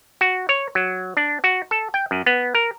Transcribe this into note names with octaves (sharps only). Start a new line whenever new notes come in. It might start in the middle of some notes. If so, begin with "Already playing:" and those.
F#4
C#5
F#3
D4
F#4
A4
G5
F#2
B3
A#4